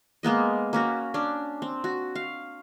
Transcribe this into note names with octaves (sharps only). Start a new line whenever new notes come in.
G#3 A#3 B3 D#5
A#3 C#4 F#4
C#4 D4
C4
F#4
F5